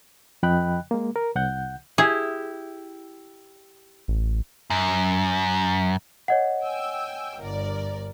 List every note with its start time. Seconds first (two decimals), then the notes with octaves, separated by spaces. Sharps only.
0.43 F2 F3 D#5 G5 B5 F#6
0.91 G#3 A#3
1.16 A#4
1.35 C2 F#5 G6
1.98 E4 G4 G#4
4.08 A1
4.70 F#2
6.28 C#5 D#5 F#5
6.62 G5 G#5 E6
7.40 G1 A#4 D5